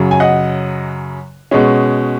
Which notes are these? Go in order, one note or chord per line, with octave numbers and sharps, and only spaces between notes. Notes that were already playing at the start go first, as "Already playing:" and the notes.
Already playing: F#2 C#3 F#3
G#5
D#5 F#5
B2 G#3 C#4